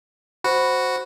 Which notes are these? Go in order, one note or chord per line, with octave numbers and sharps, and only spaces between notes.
F#4 C5 B5